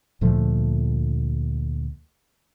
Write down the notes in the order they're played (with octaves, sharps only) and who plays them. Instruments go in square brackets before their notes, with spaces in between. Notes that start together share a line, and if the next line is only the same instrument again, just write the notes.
[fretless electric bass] D2 A#2 F3 A3